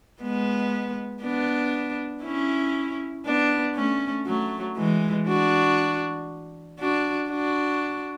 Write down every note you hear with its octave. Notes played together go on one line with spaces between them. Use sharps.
G#3 B3
B3 D4
C#4 E4
B3 D4
A3 C#4
F#3 A3
E3 G#3
D4 F#4
D4 F#4
D4 F#4